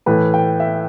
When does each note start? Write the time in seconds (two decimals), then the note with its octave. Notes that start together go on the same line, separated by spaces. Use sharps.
0.06 A2 E3 B4
0.34 G5
0.60 E5